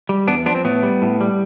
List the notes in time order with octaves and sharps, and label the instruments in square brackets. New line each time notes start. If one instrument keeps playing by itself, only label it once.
[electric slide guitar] G3
E2 B3 D4
F3 B3 D4
C4
A2 B3
G3
A2
G3